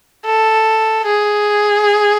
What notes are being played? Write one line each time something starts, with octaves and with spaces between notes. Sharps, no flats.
A4
G#4